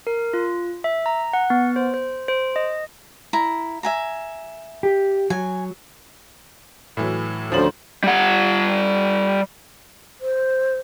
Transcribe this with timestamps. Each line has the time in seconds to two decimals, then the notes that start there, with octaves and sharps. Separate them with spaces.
0.07 A#4
0.34 F4
0.84 E5
1.06 A#5
1.33 F#5
1.50 B3
1.76 C5
1.94 C5
2.28 C5
2.56 D#5
3.33 E4 A#5
3.83 E5 G#5 A#5
4.83 G4
5.30 F#3 G#5
6.97 A2 E3 F#3
7.52 D2 F3 C#4 C5 F#7
8.04 G3 F#5
10.21 C5